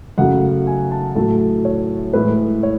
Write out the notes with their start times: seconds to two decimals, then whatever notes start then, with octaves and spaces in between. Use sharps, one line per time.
0.18 F#2 C#3 F#3 A3 F#5
0.67 G#5
0.91 A5
1.15 A2 F#3 A3 A5
1.65 C#5
2.13 A2 E3 G#3 B4
2.63 C#5